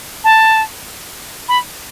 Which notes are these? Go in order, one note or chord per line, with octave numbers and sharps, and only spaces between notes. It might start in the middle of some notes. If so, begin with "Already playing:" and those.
A5
B5